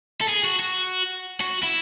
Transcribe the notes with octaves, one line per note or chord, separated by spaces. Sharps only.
A4
G#4
F#4
F#4
F#4
E4